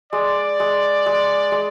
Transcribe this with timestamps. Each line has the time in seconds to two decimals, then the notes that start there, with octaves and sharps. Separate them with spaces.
0.12 G#3 D5
0.60 G#3
1.06 G#3
1.52 G#3